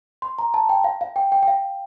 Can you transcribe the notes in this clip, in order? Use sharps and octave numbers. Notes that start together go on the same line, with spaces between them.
C6
A#5
A5
G5
F5
F5
G5
G5
G5
F5